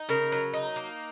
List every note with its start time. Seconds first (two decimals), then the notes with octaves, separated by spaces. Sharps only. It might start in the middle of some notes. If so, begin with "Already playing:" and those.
Already playing: D#4
0.09 C#3 A#4
0.32 F#3
0.54 D#4
0.76 A#3